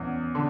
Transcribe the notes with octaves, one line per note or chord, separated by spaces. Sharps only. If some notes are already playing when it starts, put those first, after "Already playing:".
Already playing: E2 C#4
D3